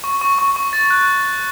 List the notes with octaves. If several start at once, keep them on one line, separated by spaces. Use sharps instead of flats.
C#6
C#6
C#6
C#6
A6
F#6